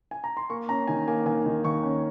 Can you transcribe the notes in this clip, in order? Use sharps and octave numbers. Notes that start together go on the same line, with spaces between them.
G#5
A#5
C6
A#3 C#6
C#4 A#5
D#3 G#5
A#3 G#5
D#2 G#5
D#3
D#2 C#6
C#4